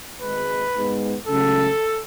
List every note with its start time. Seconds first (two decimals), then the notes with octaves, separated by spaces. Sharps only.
0.22 G#1 G#2 G#3 B4
0.75 G#2 G#3 B3
1.28 C#2 C#3 F#3 A3 A4